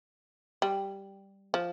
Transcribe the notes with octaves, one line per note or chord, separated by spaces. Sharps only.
G3
F3